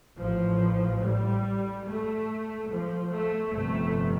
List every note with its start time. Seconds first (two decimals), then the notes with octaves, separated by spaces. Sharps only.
0.19 A1 A2 F3
1.03 G3
1.86 A3
2.69 F3
3.11 A3
3.53 G1 F2 C3 A3